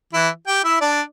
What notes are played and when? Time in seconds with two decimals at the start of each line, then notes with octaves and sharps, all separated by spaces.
0.13 E3 E4
0.47 G4 G5
0.64 E4 E5
0.81 D4 D5